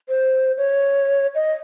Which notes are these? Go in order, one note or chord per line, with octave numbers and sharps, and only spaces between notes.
C5
C#5
D#5